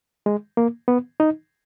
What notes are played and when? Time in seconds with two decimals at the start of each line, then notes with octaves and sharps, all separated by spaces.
0.26 G#3
0.57 A#3
0.88 B3
1.20 D#4